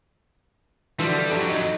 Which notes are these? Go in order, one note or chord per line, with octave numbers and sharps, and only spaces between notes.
B2 D3 E3 F3 G3
A3
F2 F#3 D4 G4
D#4